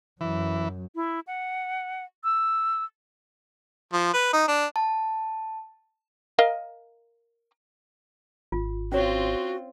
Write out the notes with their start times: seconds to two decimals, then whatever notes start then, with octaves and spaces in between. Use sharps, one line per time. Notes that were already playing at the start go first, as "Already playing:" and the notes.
0.21 F#2 E3 F#3
0.95 E4
1.27 F#5
2.24 E6
3.93 F3
4.13 B4
4.33 D#4
4.48 D4
4.76 A5
6.39 A#4 D#5 F5
8.52 G#1 F4
8.92 C4 C#4 F4 F#4 C#5